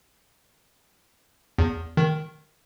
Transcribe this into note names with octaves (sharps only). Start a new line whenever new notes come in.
E2
D#3